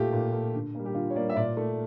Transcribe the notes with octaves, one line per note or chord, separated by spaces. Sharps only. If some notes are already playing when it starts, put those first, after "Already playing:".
Already playing: A#2 A3 F4 G4
A#2
A3
D3
G3 A#3
G4
D3 F4
C#5
G3 A#3 D5
E5
A#2 D5
A3